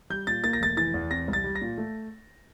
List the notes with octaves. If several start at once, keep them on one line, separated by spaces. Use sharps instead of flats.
G3 G6
A#2 A6
A#3 A6
A#6
F1 A6
E3 A6
E2
C4 A#6
C2
A6
G3
A#6
A#2
A3